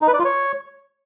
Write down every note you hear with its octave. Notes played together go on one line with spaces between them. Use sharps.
D#4
B4
D5
F4
C#5